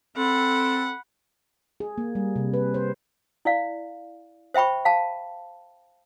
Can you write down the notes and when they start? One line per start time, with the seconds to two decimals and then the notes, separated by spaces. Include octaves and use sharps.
0.17 C4 A4 F#5 B5
1.80 G#4
1.98 A#3
2.15 G3
2.36 C3
2.54 B4
2.74 C5
3.45 E4 D5 F5
4.54 C5 E5 G5 B5 C#6
4.85 F5 A5